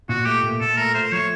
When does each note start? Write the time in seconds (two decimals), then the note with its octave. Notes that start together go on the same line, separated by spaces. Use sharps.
0.09 A#2 F#4
0.26 A3 G4
0.43 A#2
0.61 A#2 A4
0.77 A3 A#4
0.94 A3 C5
1.12 F3 C#5